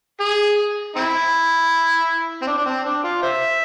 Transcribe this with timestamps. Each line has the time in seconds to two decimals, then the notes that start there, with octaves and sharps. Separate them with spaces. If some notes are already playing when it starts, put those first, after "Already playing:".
0.20 G#4
0.96 C4 E4
2.42 C4
2.47 D4
2.58 D4
2.66 C4
2.85 D4
3.04 F4
3.22 C5 E5